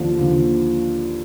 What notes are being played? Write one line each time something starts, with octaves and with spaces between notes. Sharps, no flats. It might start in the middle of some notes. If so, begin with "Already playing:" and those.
Already playing: D#2 D3 F3 D4
D#2 D3 F3